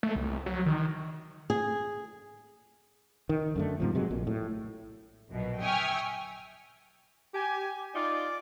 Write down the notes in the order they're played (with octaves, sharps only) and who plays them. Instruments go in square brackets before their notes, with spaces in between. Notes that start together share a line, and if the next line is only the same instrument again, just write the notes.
[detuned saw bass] A3
C2
F#3
D#3
[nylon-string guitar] G#4
[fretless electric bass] D#3
F#2 D3 A3
G#2 C3 F3
C3 F#3 G#3
A#1 A#2
A2
[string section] A#1 F#2 B2
E5 G5 G#5 C#6 D#6 F6
[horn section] G4 G#5
[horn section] D#4 F4 [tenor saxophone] D5